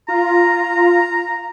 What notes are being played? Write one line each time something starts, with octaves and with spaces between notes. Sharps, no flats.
F4 A#5